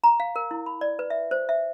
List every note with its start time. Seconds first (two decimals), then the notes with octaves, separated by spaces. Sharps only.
0.04 A#5
0.20 F5
0.36 A#4
0.51 E4
0.66 B5
0.81 D5
0.99 B4
1.10 E5
1.31 C5
1.49 E5